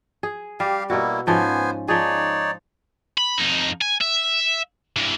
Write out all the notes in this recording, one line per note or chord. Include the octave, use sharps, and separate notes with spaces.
G#4
G3 G4 F5
B2 G3 A#3 E4 F#4
G#2 F3 B3 C#4 C5 G#5
F3 D#4 G#4 C#5 D5
B5
F2 D#4
G#5
E5
G2 E3